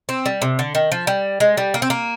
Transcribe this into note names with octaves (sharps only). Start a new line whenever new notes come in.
C4
G3
C3
D3
D#3
F3
G3
G#3
G3
A#3
C4
A#3